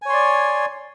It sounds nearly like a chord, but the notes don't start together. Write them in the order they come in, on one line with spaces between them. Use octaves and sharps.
G#5 C#5 C6 D5